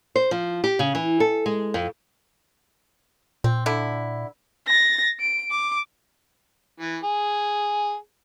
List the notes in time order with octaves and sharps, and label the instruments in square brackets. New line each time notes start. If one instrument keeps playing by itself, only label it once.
[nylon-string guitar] C5
F3
G4
C#3
E3
A4
G#3
F2
[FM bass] A#2 [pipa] C4
[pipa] D3 E4
[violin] A6 A#6
D7
D6
[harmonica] E3
G#4